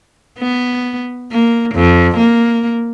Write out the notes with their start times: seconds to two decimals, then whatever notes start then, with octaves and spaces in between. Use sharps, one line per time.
0.39 B3
1.32 A#3
1.75 F2
2.17 A#3